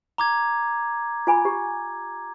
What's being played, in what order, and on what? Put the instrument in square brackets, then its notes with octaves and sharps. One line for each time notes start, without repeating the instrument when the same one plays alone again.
[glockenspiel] A#5 D6 G#6
[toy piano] F4 G#5 B5
G4